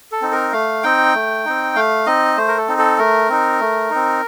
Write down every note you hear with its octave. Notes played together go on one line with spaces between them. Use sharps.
A4
C4 D#4
A#4
A3 F5
C4 D#4 G5
A3
C4 D#4
A3 F5
C4 D#4 D#5
A3 C5
A#4
A4
C4 D#4
A4
A3 A#4
C4 D#4
A3
C4 D#4